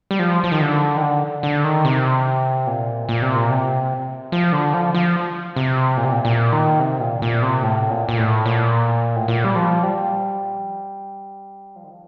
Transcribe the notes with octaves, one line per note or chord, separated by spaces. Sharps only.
G3
F3
F3
D#3
D3
D#3
D3
D3
D#3
C3
A#2
A#2
C3
A#2
C3
F3
D3
F3
F3
C3
A#2
C3
A#2
A#2
D#3
C3
A#2
A#2
C3
A2
A#2
A#2
A2
A#2
A2
A#2
G3
F3
G3
F3
D#3
F3